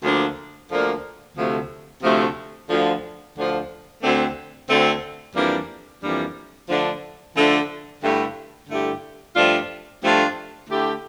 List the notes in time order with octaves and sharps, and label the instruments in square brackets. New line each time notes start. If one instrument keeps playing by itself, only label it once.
[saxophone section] D2 D3 F3 A#3 D4
D2 D3 F3 A#3 D4
D2 C3 F3 A3
D2 C3 F3 A3
D2 D3 F3
D2 D3 F3
D2 D3 A3 C4
D2 D3 A3 C4
F2 E3 G3 A#3 D4
F2 E3 G3 A#3 D4
D3 F3 A3 D4
D3 F3 A3 D4
G2 D3 A3 E4 G4
G2 D3 A3 E4 G4
G2 F3 A3 D4 F4
G2 F3 A3 D4 F4
D3 A3 E4 G4